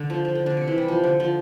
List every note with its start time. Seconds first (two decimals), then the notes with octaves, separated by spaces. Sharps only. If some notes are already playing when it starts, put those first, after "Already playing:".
Already playing: D3
0.10 F3
0.25 F3
0.35 D3
0.46 D3
0.57 C3
0.67 E3
0.78 G3
0.88 F3
1.04 D3
1.20 F3